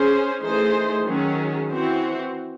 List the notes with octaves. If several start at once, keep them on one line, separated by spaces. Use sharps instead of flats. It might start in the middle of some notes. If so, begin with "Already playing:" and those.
Already playing: C#4 G#4 C5
E3 A3 D#4 G#4 C5
D#3 F#3 C#4 G#4
E3 C4 F#4 C5